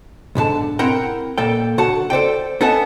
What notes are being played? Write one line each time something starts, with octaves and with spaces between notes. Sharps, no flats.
B1 G#2 D3 A5
C4 E4 A#4 F#5 G5
A#2 A#3 A4 G5
D3 F#4 F#5 A5
A4 C5 D5 G5
B3 D#4 A4 F#5 G#5 A5